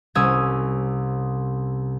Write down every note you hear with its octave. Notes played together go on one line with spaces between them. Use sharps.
C2 C#4 D#6 E6 G#6